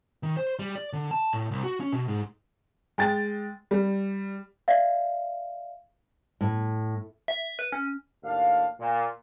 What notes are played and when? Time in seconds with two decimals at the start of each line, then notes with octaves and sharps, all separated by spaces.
0.23 D#3
0.37 C5
0.59 G3
0.75 D5
0.93 D3
1.11 A5
1.33 A2
1.51 C2
1.63 F#4
1.80 C#4
1.93 B2
2.08 G#2
2.98 G#3 G5 A6
3.71 G3
4.68 D5 E5 F5
6.41 A2
7.28 E5
7.59 B4
7.72 C#4
8.23 D#2 A2 D4 F5
8.80 A#2